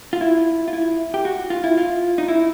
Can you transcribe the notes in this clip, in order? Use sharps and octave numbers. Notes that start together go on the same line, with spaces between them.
F4
E4
F4
E4
G4
F#4
F4
E4
F4
D#4
E4